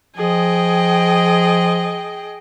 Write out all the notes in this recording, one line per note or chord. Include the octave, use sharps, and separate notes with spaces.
F3 G#4 D#5 G5